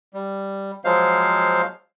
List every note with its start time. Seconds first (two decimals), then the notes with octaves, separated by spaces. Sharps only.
0.14 G3
0.85 F3 F#3 G#3 C5 F5